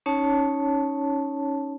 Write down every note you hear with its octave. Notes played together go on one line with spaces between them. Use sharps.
C#4 D#4 C#5 A5